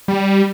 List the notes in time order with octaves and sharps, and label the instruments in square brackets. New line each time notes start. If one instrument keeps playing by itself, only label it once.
[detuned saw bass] G3